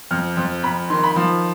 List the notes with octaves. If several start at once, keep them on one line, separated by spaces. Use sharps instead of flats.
F2 F6
F2
F2 B5
D#3 C6
B5
F3